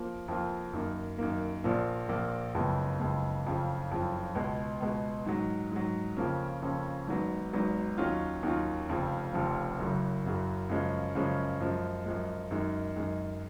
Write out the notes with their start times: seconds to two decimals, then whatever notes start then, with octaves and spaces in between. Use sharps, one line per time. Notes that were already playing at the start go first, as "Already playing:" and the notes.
Already playing: F3 A#3 F4
0.28 F2 F3 A#3 F4
0.73 F#2 D#3 A#3
1.18 F#2 D#3 A#3
1.64 A#1 A#2 F3 A#3
2.09 A#1 A#2 F3 A#3
2.55 F#1 F2 C#3 G#3 B3
2.99 F#1 F2 C#3 G#3 B3
3.45 F#1 F2 C#3 F3
3.91 F#1 F2 C#3 F3
4.35 C#2 B2 G#3
4.80 C#2 B2 G#3
5.26 G#2 D#3 F#3
5.72 G#2 D#3 F#3
6.17 F2 C#3 F3 A#3 C#4
6.62 F2 C#3 F3 A#3 C#4
7.07 G#1 G#2 D#3 F#3 B3
7.52 G#1 G#2 D#3 F#3 B3
7.98 D#2 D#3 F#3 C#4 F4
8.43 D#2 D#3 F#3 C#4 F4
8.88 F1 F2 C#3 F3
9.33 F1 F2 C#3 F3
9.79 F#1 F#2 C#3 F#3
10.23 F#1 F#2 C#3 F#3
10.69 F#2 C#3 F3 G#3 C#4
11.15 F#2 C#3 F3 G#3 C#4
11.60 F#2 F3 G#3
12.06 F#2 F3 G#3
12.51 F#2 D#3 G#3
12.96 F#2 D#3 G#3